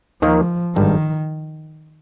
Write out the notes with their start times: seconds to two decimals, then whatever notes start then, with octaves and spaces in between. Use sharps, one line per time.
0.22 D#2 D#3 F3 A#3
0.76 G#1 G2 D#3 G3